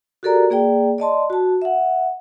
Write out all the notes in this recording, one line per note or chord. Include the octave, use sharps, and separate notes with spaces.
F#4 G4 A4 A#4 D5 A#5
A#3 G#4 D5 G5
D5 D#5 A5 C6
F#4 A5
E5 F#5